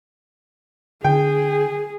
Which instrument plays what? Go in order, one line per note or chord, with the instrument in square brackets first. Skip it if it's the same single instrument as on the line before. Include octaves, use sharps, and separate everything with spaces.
[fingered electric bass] D3 [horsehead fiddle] G#4 [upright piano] G5